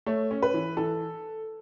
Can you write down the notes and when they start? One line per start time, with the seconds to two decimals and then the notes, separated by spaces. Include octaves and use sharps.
0.06 A3 C#5
0.31 C#4
0.43 B4
0.54 E3
0.77 E3 A4